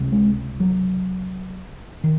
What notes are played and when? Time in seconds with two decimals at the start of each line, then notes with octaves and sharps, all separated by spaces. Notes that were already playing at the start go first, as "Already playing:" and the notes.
Already playing: C#2 C3
0.12 G#3
0.60 F#3
2.04 D#3